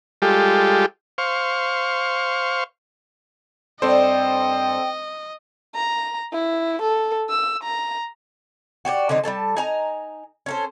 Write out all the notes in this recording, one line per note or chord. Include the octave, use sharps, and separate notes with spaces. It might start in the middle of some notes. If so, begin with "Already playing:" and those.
G3 G#3 F4 G4 A4
C5 F5 C#6
G2 C4 A4 C5 D5 D#5 G5
A#5
E4
A4
E6
A#5
F#4 G4 C#5 D5
D3 F#3 C4 D#4
G3 C#4 A4 A5
D#4 G#5 A#5
C#4 A4 C5